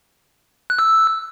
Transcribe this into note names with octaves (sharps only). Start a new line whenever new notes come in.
F#6
E6